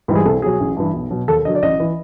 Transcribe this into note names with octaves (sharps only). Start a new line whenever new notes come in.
G#2 E3 G3
G#4
C2 A4
B2 F#3 G#4
A1
G2 E3
B1
B2 F#3
D#2 A4
D3 F#3 D#5
D5
A1 D#5
E3